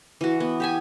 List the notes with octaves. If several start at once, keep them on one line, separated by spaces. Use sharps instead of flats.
E3 F#4
B3
G4 E5 G#5